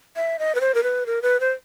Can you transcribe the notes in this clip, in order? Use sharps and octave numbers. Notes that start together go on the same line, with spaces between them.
E5
D#5
B4
C5
A#4
B4
A#4
B4
C5